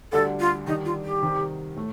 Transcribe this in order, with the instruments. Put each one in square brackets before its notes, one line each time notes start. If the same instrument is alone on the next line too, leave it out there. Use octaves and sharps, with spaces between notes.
[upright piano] D2 D3 G3 D4 [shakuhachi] A4
[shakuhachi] F4
[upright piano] D#3 G3 D4 [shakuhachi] D#4
[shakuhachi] F4
G4
[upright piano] C3 D#3 G3
A2 A3